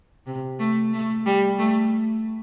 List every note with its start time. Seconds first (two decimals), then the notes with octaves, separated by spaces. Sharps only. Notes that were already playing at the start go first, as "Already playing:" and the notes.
0.26 C3
0.59 A3
0.93 A3
1.26 G3
1.59 A3